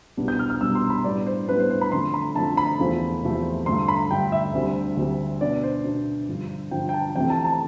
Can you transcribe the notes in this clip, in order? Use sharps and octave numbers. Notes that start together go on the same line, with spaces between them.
C2 B2 G3 B3 D4
G6
F6
F6
C2 B2 G3 B3 D4 E6
C6
B5
A2 G3 B3 D4 D5
C5
A2 G3 B3 D4 B4
C5
C5
B5
F2 D3 A3 C6
B5
F2 D3 A3 A5
B5
E2 C3 F3 A3 C4
E2 C3 F3 A3 C4
G2 D3 A3 C6
B5
G2 D3 A3 G5
E5
D2 D3 G3 C4
D2 D3 G3 C4
B2 B3 D4 D5
C5
B2 B3 D4
G2 D3 F3
G2 D3 F3 G5
G5
A5
F2 C3 E3 A3 C4 G5
A5
A5